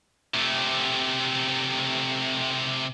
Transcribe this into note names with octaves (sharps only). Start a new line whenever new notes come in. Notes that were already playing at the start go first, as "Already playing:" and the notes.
C3 A3